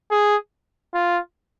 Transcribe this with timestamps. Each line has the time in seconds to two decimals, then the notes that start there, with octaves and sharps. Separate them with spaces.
0.11 G#4
0.94 F4